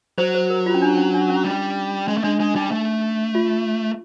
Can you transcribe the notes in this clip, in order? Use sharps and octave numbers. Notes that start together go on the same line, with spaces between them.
F#3 C5
C5
A#4
F4
C#4
D4
C#4
D4
C#4
G3
G#3 C#4
A3
G#3 D4
G#3 D4
G3 D#4
A3
F4